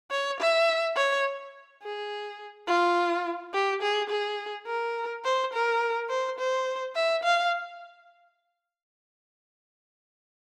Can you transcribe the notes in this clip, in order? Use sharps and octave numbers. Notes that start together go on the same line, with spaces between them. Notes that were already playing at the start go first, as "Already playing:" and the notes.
C#5
E5
C#5
G#4
F4
G4
G#4
G#4
A#4
C5
A#4
C5
C5
E5
F5